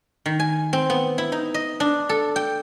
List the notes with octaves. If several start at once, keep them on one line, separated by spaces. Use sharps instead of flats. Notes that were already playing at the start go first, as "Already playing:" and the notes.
D#3
G#5
C4
B3
E4
D#4
D#5
D4
A4
G5